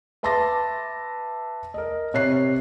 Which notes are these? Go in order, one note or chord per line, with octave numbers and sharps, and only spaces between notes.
B4 E5 A5 C6 D6 A#6
A#4 D#5
C3 C#5 F#6 C7